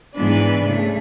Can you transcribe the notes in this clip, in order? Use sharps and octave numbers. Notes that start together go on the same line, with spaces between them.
G#2 E3 B3 D4 B4 D5
C#3 A3